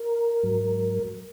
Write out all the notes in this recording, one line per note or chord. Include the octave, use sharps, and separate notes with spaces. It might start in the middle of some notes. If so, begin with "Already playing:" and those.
Already playing: A#4
G#2 F#3